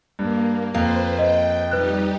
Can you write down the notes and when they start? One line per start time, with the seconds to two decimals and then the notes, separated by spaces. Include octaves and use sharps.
0.19 G2 A#3
0.74 F2 A#3 B4 C5
1.19 D#5 G5
1.71 G3 D#4 G4 B4 F#6